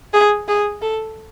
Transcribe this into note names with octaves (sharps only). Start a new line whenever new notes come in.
G#4
G#4
A4